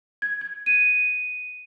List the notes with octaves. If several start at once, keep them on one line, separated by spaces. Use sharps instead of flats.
G#6
G#6
D#7